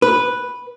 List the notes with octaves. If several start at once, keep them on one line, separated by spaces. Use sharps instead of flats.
B4